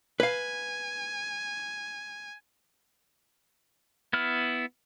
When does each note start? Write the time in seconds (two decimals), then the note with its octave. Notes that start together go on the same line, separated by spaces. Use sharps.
0.20 B4 F5 G#5
4.13 B3 E4 F6